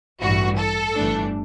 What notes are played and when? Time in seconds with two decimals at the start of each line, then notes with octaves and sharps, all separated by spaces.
0.21 A1 G2 E3 F#4
0.57 A4
0.95 G1 G2 E3 A3 D4